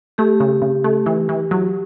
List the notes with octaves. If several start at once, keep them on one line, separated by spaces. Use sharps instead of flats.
A3 G4
C#3
C#3
A3
E3
E3
F#3